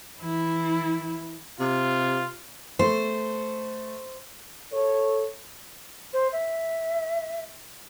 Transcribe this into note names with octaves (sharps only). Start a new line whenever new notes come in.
E3 E4
C3 F4
A3 C5
A4 C#5
C5
E5